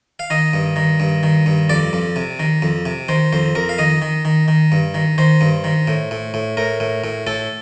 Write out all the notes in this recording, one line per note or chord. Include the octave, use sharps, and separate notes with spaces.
F5
D#3 D#5
G2
D#3
G2
D#3
G2
F2 D5
F2
C3
D#3
F2
C3
D#3 C5
F2 C5
F2 A#4
F5
D#3 D#5
D#3
D#3
D#3
G2
D#3
D#3 C5
G2
D#3
A2
A2
A2
A2 A#4
A2
A2
A2 A4